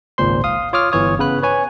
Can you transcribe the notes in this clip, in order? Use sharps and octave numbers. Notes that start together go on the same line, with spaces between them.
G#1 C#2 A#2 C5 C6
F5 D#6
F4 C#5 D6 D#6 F6
G1 E3 C#5 D#6
C#3 B3 B4 F#6
B4 C#5 G#5